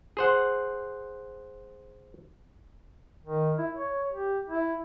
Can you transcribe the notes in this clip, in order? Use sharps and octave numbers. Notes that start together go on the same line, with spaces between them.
G#4 C5 F#5
D#3
E4
C#5
G4
E4